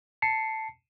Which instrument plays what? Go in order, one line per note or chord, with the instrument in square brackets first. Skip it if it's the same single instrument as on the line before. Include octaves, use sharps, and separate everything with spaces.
[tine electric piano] A5 C7 C#7